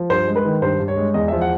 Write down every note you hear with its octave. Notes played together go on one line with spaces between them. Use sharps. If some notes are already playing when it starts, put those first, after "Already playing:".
Already playing: F3
G2 C5
G#3
B4
D#3
G2 C5
G2
C#5
G#3
E2 D#5
E5
F3
F#5